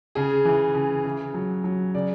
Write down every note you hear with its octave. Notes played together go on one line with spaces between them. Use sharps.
C#3 G#4
E3
C#3
C#3
F#3
F#3
C#3 D5